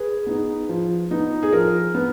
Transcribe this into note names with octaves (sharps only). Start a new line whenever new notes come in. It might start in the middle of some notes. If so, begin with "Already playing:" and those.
Already playing: G#4 B4
B3 D#4
F3
B3 D#4
G#4
F3 A#4
B3